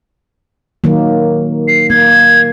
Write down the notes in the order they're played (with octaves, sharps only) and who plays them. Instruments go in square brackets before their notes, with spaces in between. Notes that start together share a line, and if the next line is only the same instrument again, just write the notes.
[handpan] D#3 F#3 A#3
[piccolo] C7
[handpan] A#3 [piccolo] G#6